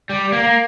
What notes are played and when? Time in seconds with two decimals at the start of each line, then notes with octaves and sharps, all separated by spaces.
0.10 G3
0.32 A#3
0.43 A#3